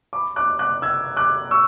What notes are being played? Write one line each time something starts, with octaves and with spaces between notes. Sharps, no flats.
B5 D6
D6 F#6
D6 F#6
E6 G#6
D6 F#6
C#6 E6